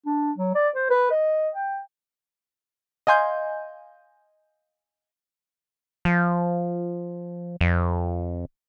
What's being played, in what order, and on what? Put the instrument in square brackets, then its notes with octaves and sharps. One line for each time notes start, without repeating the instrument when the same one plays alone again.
[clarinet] D4
F#3
D5
C5
B4
D#5
G5
[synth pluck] D#5 F5 G#5 C6 G6
[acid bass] F3
F2